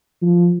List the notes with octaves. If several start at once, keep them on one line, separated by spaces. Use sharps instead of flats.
F3